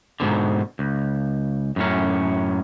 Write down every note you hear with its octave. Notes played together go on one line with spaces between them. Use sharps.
G#2 B2 D3
C#2
F#2 A2 C#4